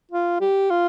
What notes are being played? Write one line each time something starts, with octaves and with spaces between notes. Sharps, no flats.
F4
G4
F4